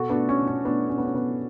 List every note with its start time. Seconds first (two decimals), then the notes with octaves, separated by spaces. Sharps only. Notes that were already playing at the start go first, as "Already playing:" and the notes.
Already playing: B2 F#4 A4
0.10 B3 D4
0.16 A3
0.29 C#4
0.41 B2
0.47 C#4
0.65 A3 B3 D4
0.90 A3 C#4
0.98 B3
1.05 C#4
1.14 B2 B3